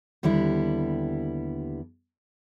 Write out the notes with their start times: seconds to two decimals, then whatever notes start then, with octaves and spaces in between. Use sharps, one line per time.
0.23 D#2 D3 G3 B3 E4